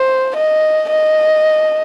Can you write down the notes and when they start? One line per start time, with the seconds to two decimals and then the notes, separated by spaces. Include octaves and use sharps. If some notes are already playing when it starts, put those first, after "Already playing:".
Already playing: C5
0.36 D#5
0.90 D#5